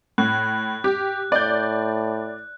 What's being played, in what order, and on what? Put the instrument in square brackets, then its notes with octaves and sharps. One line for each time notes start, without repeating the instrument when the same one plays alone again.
[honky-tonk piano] A2 [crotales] F#6
[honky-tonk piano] G4
[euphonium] A2 [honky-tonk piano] D5 G6